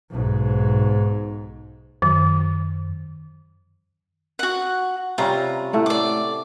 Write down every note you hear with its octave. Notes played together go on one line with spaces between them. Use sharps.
B1 G#2
F#2 D#3
F#4 F#5
C3 G3 C#4 F4 A#5
A2 A3 F#5
D5 D6